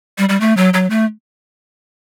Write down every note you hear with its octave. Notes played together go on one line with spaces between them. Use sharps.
G3
G3
A3
F#3
F#3
A3